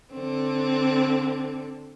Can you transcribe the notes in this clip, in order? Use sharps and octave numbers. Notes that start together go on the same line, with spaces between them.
D3 C4